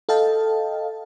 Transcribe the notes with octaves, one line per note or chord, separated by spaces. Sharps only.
A4 D#5 F5 G5 A5